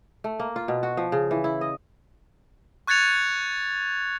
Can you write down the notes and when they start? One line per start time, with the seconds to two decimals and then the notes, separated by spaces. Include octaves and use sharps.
0.24 A3
0.40 A#3
0.56 F4
0.68 B2
0.83 F#4
0.97 F3
1.12 C#3
1.31 E3
1.44 E4
1.61 D#5
2.87 C#6 F#6 G#6 A6 C#7 F7